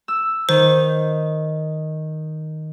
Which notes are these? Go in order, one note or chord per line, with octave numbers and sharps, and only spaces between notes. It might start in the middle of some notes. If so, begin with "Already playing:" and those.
E6
D#3 C5